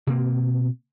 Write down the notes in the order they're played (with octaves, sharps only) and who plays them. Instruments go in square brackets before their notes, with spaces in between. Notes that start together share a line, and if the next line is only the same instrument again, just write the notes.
[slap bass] B2 A#3 C4